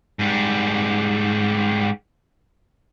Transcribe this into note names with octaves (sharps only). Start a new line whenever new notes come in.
G#2 G3